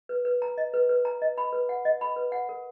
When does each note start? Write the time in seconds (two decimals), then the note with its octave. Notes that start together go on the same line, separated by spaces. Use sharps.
0.09 B4
0.25 B4
0.42 A#5
0.58 D#5
0.74 B4
0.89 B4
1.05 A#5
1.22 D#5
1.38 B5
1.53 B4
1.69 F#5
1.85 D#5
2.01 B5
2.16 B4
2.32 F#5
2.49 A#4